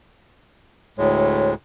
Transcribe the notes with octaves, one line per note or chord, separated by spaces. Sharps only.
D2 A2 G#3 C#5